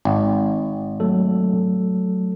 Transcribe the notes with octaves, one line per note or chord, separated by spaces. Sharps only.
G#1
F#3 A3 A4